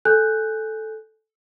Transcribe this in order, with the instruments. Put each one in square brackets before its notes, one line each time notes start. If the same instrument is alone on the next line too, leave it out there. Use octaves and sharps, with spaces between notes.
[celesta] A4 G#5 F#6 G6